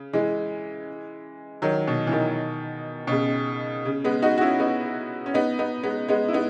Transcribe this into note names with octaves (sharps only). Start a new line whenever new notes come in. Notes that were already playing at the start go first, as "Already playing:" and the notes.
Already playing: C#3
E3 G#3
D#3 F#3
B2
E3
B2 D#3
B2
C#3
C#3
G#3 B3
D#4 F#4
F#4
C#4 E4
B3 D#4
C#4
B3 D#4
B3 D#4
G#3 B3
G#3 B3
E4
B3 D#4